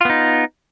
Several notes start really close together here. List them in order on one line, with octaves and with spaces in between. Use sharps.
F4 B3 D#4